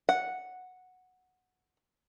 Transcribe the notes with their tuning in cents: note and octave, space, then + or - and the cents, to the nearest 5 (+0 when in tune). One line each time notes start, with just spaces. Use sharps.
F#5 -5